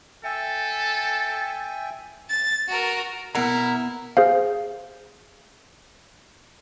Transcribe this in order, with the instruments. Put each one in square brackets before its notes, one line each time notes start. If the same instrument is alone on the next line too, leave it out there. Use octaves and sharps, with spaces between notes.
[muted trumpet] A4 [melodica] E5 G5 G#5
[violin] A6
F#4 A#4
[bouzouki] B2 A#4 [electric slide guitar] B3 F#5 A#5 [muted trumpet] E4
[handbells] G#4 C5 F5